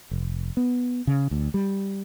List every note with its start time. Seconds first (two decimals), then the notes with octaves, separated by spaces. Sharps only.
0.11 F1
0.57 B3
1.07 C#3
1.31 D2
1.54 G3